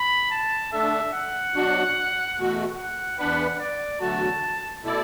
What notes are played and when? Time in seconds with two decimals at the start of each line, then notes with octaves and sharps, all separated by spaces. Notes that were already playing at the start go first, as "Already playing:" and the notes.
Already playing: B5
0.31 A5
0.72 D3 A3 D4 A4 E5
1.13 F#5
1.54 B2 F#3 D4 F#4
2.36 E2 B2 A3 F#4
2.78 F#5
3.18 E2 E3 B3 D4 B4 F#5
3.59 D5
4.01 E2 D3 F#3 A3 F#4 A5
4.83 B2 A3 E4 A4 D5